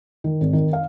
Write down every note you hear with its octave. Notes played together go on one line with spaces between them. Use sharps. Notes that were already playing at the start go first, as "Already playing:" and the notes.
D#3
G#1
D#3
F5